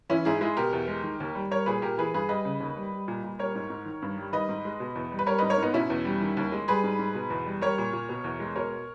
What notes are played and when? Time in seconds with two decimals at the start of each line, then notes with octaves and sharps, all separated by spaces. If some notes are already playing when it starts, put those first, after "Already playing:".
0.09 E3 C#4 E4
0.25 G#2 E4 G#4
0.41 G#3 E4 G#4
0.57 B2 G4 A#4
0.73 E2
0.88 G#3
1.03 D#3
1.20 D#2
1.35 G3
1.51 G3 A#4 C#5
1.66 A#2 G#4 B4
1.82 A#2 G4 A#4
1.98 E3 G#4 B4
2.14 G2 G#4 B4
2.29 G3 B4 D#5
2.45 C#3
2.60 D#2
2.77 G3
2.92 G3
3.08 A#2
3.24 A#2
3.39 G3 A#4 C#5
3.55 G#2
3.70 G#2
3.85 D#3
4.02 G2
4.17 G3
4.33 D#3 B4 D#5
4.49 G#2
4.65 G#3
4.80 B2
4.96 E2
5.12 G3
5.19 B4
5.26 G3 A#4 C#5
5.38 G#2 B4 D#5
5.50 A#4 C#5
5.58 G#2 B3 D#4
5.74 B2 C#4 E4
5.90 E2
6.05 G3
6.22 D#3
6.37 D#2
6.52 G#3
6.68 G3 G#4 B4
6.84 G#2
6.99 G#2
7.15 B2
7.30 E2
7.46 G3
7.62 G3 A#4 C#5
7.78 A#2
7.93 A#2
8.09 B2
8.24 E2
8.40 G#3
8.56 B2 A#4 C#5